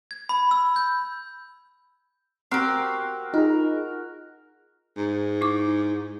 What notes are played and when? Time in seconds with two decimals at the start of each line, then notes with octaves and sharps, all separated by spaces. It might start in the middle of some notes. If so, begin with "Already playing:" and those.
0.11 G#6
0.29 B5
0.51 E6
0.76 G6
2.51 C4 F#4 G4 A#4 C7
3.34 D#4 F4 G#4 A#4
4.97 G#2
5.41 E4 D6